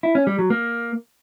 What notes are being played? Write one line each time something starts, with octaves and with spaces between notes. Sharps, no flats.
E4
C#4
G3
F#3
A#3